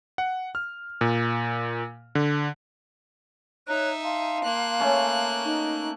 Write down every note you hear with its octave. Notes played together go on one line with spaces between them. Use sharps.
F#5
F6
A#2
D3
D#4 C#5 E5 A#5 F#6
F5 A5 C6
A#3 F#6
A3 C#4
D#4